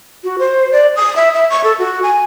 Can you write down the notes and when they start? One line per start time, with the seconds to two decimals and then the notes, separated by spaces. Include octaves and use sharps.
0.24 F#4
0.39 C5
0.72 D5
0.96 D#6
1.16 E5
1.34 E5
1.50 C#6
1.64 A4
1.79 F#4
2.03 G#5